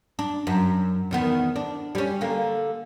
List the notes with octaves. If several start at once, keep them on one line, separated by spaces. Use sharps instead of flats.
D4
F#2
E2 D#3 B3
D4
G3 C#4
D3 A#3